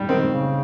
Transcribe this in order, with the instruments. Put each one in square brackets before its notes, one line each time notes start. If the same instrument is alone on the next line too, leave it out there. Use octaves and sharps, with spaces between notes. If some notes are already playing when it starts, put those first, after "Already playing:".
Already playing: [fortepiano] G3
[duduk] D#3 [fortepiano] C4
[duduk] C#3